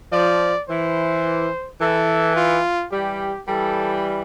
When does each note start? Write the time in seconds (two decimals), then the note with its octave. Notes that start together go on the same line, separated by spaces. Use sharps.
0.12 F3 D5
0.69 E3 C5
1.81 E3 A4
2.36 F4
2.92 E3 G3 G4
3.47 E3 G3 A4